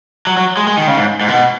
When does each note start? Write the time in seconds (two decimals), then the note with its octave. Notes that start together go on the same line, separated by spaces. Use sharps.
0.27 F#3
0.37 F#3
0.57 G#3
0.67 G#3
0.77 D#3
0.88 C#3
0.97 G#2
1.21 G#2
1.28 B2